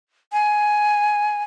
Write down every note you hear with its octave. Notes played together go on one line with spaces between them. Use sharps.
G#5